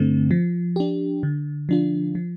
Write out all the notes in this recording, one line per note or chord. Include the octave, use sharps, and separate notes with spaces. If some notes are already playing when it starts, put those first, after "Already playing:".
Already playing: G2 D3 A3 C4
F3
D4 G4
D3
F3 D4 F4
F3